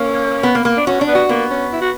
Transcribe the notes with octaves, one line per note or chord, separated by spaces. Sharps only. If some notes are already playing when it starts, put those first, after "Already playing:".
Already playing: A#3 C#4
B3
A#3
A#3
D4
C#4 F#4
D4
B3
F#4
A#3 B3
C#4
E4
F#4